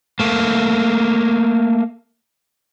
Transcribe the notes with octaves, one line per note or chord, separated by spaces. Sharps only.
A3 A#3